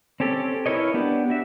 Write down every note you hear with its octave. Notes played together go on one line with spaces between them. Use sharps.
C4 C#4 G4 A4
E4 A#4 B4 C#5 D#5
B3 D4 G4
F#4 E5